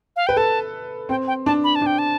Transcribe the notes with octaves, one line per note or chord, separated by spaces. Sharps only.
F5
B4 G5
A4 A5
C4 G5
G5
D4 A5
B5
A5
D4
G5
A5